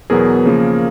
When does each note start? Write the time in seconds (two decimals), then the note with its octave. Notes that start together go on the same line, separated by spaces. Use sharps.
0.10 E2 B2 F#3 B3 G#4 A#4
0.46 C#3 F3 A#3